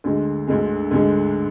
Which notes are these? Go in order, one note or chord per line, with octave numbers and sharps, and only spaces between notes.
D2 D3 G#3
D2 D3 G#3
D2 D3 G#3